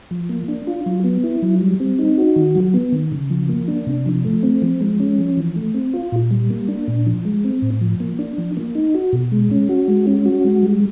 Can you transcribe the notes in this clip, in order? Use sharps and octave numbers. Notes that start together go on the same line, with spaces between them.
F3
A#3
D4
F4
F#3
B3
E4
F#3
G3
C4
D#4
F#4
D#3
F#3
B3
D#3
C#3
F3
A#3
D4
C3
F3
A3
C4
F3
G#3
C#4
F3
E3
A3
C4
F4
A#2
G3
A#3
D4
A#2
F3
G#3
C4
A2
F3
A#3
D4
F3
A#3
D#4
F#4
B2
G#3
C#4
F#4
G#3
C#4
F#4
G#3
G3